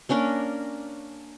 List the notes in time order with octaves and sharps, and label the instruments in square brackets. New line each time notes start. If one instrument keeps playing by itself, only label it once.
[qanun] A#3 C#4 D4 A#4